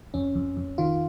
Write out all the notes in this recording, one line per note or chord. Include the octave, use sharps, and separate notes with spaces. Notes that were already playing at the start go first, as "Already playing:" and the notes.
F2 C#4
F2
F2
D#3 F4